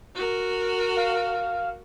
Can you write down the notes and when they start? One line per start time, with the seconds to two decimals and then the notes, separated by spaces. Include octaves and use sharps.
0.15 F#4 A#4
0.96 F5